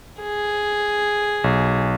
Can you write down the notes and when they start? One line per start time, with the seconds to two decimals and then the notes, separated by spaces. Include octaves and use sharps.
0.22 G#4
1.44 B1